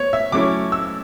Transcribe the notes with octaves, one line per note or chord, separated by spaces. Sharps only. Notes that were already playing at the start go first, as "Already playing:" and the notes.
Already playing: B3 C#5
E5
F#3 A3 C#4 E4 D6
E6